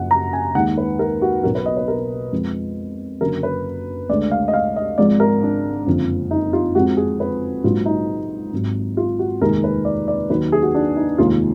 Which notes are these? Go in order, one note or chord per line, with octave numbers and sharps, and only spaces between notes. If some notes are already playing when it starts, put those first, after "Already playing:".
Already playing: F#1 F#2 F3 F#5
A#5
G#5
D#2 D#3 G#3 F#5
B4
A#4
F#4
B1 B2 F#3 A#4
B4
D#5
B4
A#4
F2 F3 G#3
F#1 F#2 D3 F#3 A#4
B4
D2 D3 G#3 D5
F5
D#5
F5
D#5
G#1 G#2 F3 G#3 D5
A#4
D4
F#1 F2 D3 F3
D#4
F4
F2 F3 G#3 F#4
G#4
B4
A#1 G#2 F#3 F4
D#4
G#1 G#2 F#3
F4
F#4
F1 D#2 D#3 G#3 A#4
B4
D5
D5
D#2 D#3 F#3 B4
G#4
F#4
D4
D#4
F1 D#2 D#3 G#3 F4